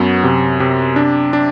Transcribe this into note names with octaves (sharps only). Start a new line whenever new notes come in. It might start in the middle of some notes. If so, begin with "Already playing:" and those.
Already playing: F#2 F#3 B3
C3
C3
D4
D4